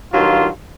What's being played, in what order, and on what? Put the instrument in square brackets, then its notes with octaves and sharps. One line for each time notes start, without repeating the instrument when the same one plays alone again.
[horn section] G2 D#3 F#3 F4